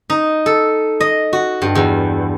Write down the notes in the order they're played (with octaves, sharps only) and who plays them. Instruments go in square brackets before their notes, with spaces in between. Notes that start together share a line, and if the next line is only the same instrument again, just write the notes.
[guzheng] D#4
A4
D#5
F#4
G2
E2